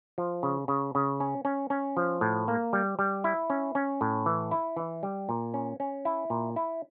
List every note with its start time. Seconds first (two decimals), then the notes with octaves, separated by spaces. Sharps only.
0.18 F3
0.43 C#3
0.68 C#3
0.95 C#3
1.20 C#4
1.45 C#4
1.70 C#4
1.97 F3
2.21 A2
2.48 A#3
2.73 G3
2.99 G3
3.24 E4
3.50 C#4
3.75 C#4
4.01 A2
4.26 E3
4.51 E4
4.76 E3
5.03 G3
5.29 A#2
5.54 C#4
5.80 C#4
6.05 E4
6.30 A#2
6.56 E4